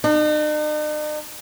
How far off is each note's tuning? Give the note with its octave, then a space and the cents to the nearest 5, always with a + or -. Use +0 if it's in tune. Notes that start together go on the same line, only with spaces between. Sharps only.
D#4 -45